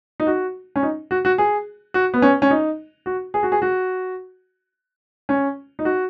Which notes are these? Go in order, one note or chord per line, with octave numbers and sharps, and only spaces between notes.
D#4
F#4
C#4
D#4
F#4
F#4
G#4
F#4
B3
C#4
C#4
D#4
F#4
G#4
F#4
G#4
F#4
C#4
D#4
F#4